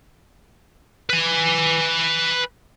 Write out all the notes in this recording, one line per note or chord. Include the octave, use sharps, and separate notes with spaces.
B4 G#5